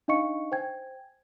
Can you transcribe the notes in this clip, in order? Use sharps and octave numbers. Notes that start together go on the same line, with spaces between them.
D4 D#4 D#5 F5 C#6 C#7
C5 G5 G#5 G#6